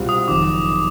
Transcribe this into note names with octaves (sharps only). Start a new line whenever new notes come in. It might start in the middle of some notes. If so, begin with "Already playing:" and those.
Already playing: C2 B2 G3 C4 F4
D#6
F#1 F2 C3 D#3 D6